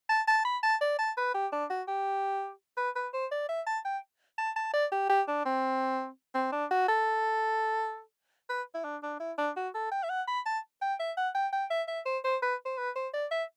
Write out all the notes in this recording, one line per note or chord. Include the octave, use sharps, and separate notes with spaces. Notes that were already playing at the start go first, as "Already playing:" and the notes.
A5
A5
B5
A5
D5
A5
B4
G4
D4
F#4
G4
B4
B4
C5
D5
E5
A5
G5
A5
A5
D5
G4
G4
D4
C4
C4
D4
F#4
A4
B4
E4
D4
D4
E4
D4
F#4
A4
G5
E5
F#5
B5
A5
G5
E5
F#5
G5
G5
E5
E5
C5
C5
B4
C5
B4
C5
D5
E5